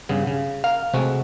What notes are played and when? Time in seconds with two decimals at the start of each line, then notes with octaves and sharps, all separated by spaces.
0.09 G2 C#3 B3
0.27 C#3
0.64 A#4 F5
0.94 C3 G#3 A3 F#4